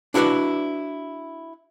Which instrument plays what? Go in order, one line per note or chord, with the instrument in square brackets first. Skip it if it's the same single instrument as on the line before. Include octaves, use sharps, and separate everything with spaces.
[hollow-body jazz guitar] D4 E4 F#4 B4 D5